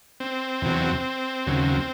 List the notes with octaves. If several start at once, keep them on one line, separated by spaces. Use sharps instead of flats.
C4
E2 C3 F#3
D#2 C#3 F#3